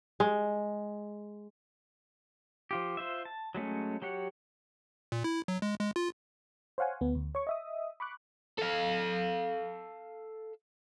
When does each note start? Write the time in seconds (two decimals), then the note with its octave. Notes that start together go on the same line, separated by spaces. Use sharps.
0.20 G#3
2.71 F3 F4 G4
2.97 F4 C5 E5
3.25 A5
3.55 F#3 G#3 A3 C#4
4.02 F#3 G4 C#5 F#5
5.12 A#2
5.24 E4
5.48 F#3
5.62 G#3
5.80 G#3
5.96 F4
6.78 C5 C#5 F5 F#5 G#5
7.01 D2 B3
7.15 D2
7.35 C#5 C#6
7.47 D#5 E5 D#6
8.00 B5 C#6 D6 F#6
8.59 A4 F5